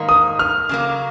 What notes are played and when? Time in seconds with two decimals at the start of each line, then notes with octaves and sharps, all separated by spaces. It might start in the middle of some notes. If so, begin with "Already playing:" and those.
Already playing: G#2 D#3 A#3
0.09 D#6
0.39 F6
0.69 C#3 F#3 A#3